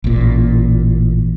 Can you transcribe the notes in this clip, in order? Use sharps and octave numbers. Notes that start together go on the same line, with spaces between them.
A1 A#2